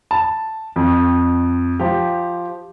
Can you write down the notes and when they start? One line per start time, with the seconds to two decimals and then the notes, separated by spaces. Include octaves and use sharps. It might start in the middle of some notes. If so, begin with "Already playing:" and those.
0.11 A5
0.76 F2
1.80 F3 G4